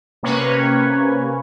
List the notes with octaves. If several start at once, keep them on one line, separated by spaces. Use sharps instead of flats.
C3 A#3 C#4 B4 C#5